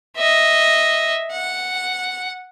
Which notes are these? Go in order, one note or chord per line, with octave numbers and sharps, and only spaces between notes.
D#5 E5
F#5